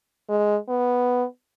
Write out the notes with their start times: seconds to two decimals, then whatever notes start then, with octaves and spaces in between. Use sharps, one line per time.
0.29 G#3
0.69 B3